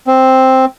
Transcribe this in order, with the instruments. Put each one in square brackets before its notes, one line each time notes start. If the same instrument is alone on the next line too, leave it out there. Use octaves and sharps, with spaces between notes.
[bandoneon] C4